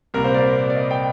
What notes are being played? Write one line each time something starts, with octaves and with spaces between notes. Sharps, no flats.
C2 A#2 A#4
C5
D5
D5
D#5
G5